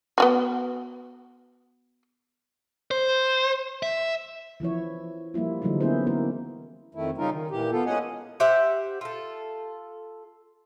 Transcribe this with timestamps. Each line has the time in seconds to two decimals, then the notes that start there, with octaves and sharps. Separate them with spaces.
0.18 B3 F4 F#4
2.91 C5
3.83 E5
4.60 E3 F3 E4 C#5
5.34 F3 G3 A#3 E4 F4
5.62 D3 E3 F#3 G3 A3 D#4
5.81 A#3 B3 C#4 E4 G#4 C5
6.07 A#3 E4 A#4 C5
6.95 F2 D#3 A3 E4
7.18 C#3 G3 C#4 D#4 F4 A#4
7.31 D#3
7.51 A#2 E3 G4
7.72 B3 F4 A4
7.86 G#3 A#3 C#4 D#5 F#5 G#5
8.40 G4 C5 E5 F#5
9.01 F4 A4